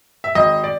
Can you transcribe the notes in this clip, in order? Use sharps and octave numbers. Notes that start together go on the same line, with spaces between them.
E5
G#1 D#5
D5